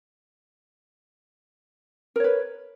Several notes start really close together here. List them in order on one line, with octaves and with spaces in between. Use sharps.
A#4 C#5 B4